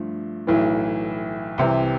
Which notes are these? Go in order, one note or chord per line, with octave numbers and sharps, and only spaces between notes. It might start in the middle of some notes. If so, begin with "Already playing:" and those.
Already playing: G2 F3 A3
B1 A2 E3
C2 C3 E3